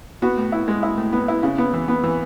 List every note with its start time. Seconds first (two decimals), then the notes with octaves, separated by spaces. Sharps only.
0.22 B3 F#4
0.37 A2
0.52 E4
0.68 G#3
0.83 E4
0.97 A2
1.13 B3
1.28 E4
1.43 C#3
1.58 B3
1.74 E3
1.88 B3
2.03 E3